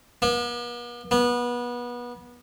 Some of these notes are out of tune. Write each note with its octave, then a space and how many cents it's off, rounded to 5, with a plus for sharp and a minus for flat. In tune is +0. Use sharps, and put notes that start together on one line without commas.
B3 -45
B3 -25